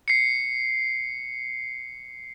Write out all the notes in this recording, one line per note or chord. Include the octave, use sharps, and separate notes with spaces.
C7 C#7